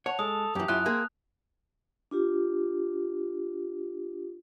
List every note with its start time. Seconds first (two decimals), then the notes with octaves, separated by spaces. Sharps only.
0.06 C#5 F#5 A5 F7
0.19 G#3 A4 D#6
0.55 F#2 E3 G4
0.68 F#2 E4 F4 F#6
0.86 A#3 C4 G#4
2.11 D4 F4 G4